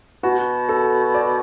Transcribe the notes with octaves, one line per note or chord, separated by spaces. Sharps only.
B2 F#4
A4
D5